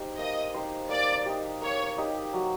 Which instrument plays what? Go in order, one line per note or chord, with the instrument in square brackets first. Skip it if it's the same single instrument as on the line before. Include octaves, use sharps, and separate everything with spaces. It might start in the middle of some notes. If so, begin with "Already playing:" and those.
Already playing: [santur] D#4 G4 C5
[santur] A#3 [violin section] D#5
[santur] D#4 G4 C5
[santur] A#3 [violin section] D5
[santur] D#4 G4
[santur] A#3 [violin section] C#5
[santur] D#4 G4
F#3